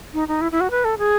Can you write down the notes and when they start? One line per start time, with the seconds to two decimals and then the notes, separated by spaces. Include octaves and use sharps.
0.14 D#4
0.28 D#4
0.41 E4
0.52 E4
0.60 F#4
0.71 B4
0.84 A4
0.98 G#4